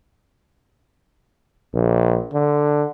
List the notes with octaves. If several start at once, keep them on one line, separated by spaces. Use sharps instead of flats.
A#1
D3